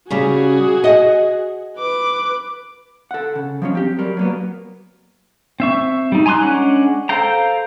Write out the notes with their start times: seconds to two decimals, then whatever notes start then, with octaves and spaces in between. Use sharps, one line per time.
0.10 C#3 G3 F#4 G#4
0.84 D#5 F#5
1.78 B4 D6
3.11 A4 F#5
3.35 C#3
3.62 F3 F#3 C#4
3.75 C4 G4
3.99 F#3 G3 A#4
4.17 F#3 A#3 B3
5.60 C4 E5 C#6
6.12 G3 D#4
6.26 G#5 A#5 C6 D6 F#6
6.42 G#3 C#4 D4 F#5
7.09 A4 C5 F5 G5 A#5